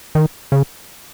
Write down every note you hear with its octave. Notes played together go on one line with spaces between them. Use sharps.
D#3
C#3